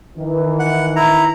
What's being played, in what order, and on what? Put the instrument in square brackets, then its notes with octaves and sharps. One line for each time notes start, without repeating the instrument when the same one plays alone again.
[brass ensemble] D#3 E3
[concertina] F#5
E4 A#5